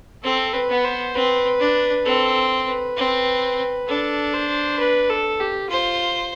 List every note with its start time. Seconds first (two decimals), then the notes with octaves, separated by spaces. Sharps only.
0.23 C4 A4
0.53 B4
0.69 B3
0.85 C5
1.14 C4 B4
1.60 D4
2.05 C4 A4
2.67 B4
2.97 C4
3.88 D4 A4
4.34 C5
4.80 B4
5.10 A4
5.40 G4
5.70 F4 C5